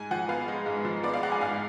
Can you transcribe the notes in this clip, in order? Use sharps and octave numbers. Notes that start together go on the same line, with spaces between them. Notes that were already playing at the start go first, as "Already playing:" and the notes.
Already playing: G#2 G#5
F3 F#5
B3 F5
G#3
G#2
F3
B3 D5
F5
G#3 F#5
G#5
G#2 F5